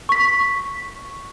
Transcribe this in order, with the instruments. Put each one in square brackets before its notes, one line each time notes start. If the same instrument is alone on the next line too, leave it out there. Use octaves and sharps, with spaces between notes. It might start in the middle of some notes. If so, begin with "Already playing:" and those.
[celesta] C#6 B6